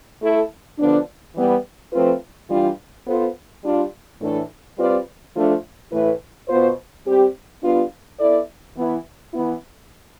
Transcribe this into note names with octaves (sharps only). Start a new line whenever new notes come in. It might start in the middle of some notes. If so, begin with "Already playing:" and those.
A3 E4 A4
D3 F3 B3 D4
E3 G3 B3
F3 A3 C4 F4 B4
E3 G3 D4 F4
B3 F4 A4 C5
G3 D4 F4
A2 E3 A3 D4 A4
G3 C4 F4 B4 D5
F3 A3 D4 F4 A4
A2 E3 A3 E4 B4
B2 B3 F4 C5
G3 C4 G4
G3 B3 D4 F4
B3 E4 A4 D5
E3 B3 E4
E3 B3 E4